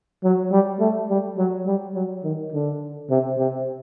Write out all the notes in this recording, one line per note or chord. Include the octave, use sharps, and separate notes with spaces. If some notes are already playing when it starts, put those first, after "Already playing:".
F#3
G3
A3
G3
F#3
G3
F#3
D#3
D3
C3
C3